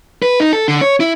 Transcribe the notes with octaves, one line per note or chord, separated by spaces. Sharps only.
B4
D#4
A4
D3
C#5
E4